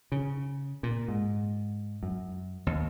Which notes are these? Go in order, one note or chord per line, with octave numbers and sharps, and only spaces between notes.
C#3
A#2
G#2
F#2
D#2